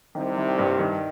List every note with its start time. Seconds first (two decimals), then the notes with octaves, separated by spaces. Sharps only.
0.15 C2 C3 D#3
0.37 D#3
0.59 G2
0.79 D#3